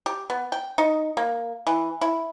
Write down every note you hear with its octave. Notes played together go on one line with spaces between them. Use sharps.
G4
B3
G5
D#4
A#3
E3
E4